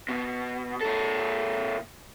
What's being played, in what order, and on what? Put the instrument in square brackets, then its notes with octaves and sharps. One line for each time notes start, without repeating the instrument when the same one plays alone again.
[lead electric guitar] B2
A#2 A4